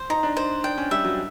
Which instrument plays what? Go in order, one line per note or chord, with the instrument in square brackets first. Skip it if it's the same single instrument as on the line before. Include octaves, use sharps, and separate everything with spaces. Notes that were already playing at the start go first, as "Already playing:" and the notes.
Already playing: [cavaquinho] C5
[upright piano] D#4 [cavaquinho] A#5
[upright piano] D4
[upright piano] D#4 [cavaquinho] C5
[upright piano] D4 [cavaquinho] G5
[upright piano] C#4
[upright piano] G3 [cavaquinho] E5
[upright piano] F#3